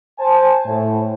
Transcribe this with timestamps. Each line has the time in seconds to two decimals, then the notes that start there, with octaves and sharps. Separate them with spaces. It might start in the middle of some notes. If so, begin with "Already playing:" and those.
0.19 C5 G#5 A5
0.65 A2